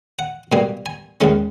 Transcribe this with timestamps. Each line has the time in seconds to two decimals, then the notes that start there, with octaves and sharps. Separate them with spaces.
0.19 F#5
0.52 B2 G3 A#3 G#5
0.86 G#5
1.21 D#2 D#3 G#3 C#4